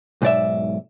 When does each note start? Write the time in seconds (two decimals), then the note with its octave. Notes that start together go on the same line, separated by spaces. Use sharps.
0.22 B1 G#2 D5 E5